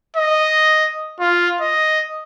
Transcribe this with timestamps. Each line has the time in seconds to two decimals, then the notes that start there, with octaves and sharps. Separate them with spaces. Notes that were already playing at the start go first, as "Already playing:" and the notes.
0.17 D#5
1.20 F4
1.61 D#5